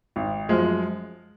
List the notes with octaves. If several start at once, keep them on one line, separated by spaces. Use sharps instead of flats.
G#1
F#2 F3 G#3